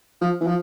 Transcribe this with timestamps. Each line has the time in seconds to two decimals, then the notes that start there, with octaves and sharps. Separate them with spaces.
0.21 F3
0.41 E3
0.47 F3